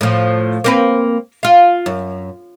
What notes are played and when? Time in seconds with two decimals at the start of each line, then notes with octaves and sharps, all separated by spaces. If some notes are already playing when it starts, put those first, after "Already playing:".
0.01 A2 F3
0.64 A#3 C4 B4
1.43 F4 F5
1.86 F#2